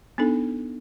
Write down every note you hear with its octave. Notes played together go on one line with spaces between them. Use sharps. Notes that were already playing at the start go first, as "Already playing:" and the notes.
B3 D4 D#4 A4